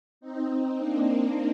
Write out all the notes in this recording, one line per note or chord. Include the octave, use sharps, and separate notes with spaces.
C4 D#4
C4 D#4
A#3 D4
A#3